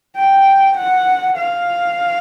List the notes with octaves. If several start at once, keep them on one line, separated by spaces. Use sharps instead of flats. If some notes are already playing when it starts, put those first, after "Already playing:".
G5
F#5
F5